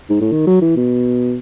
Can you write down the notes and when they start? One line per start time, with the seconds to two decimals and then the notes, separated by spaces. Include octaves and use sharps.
0.10 G#2
0.21 A2
0.32 D#3
0.47 F#3
0.62 E3
0.76 B2